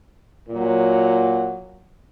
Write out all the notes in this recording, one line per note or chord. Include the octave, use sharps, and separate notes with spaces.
A#2 F#3